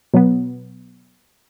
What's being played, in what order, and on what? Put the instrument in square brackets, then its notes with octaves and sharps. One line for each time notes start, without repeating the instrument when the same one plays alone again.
[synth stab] B2 F#3 B3